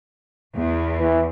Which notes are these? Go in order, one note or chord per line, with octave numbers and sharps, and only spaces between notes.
E2
E3